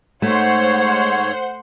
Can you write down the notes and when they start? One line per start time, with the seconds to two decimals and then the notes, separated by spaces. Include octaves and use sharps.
0.22 G#2 A3 C5 C#5 F#5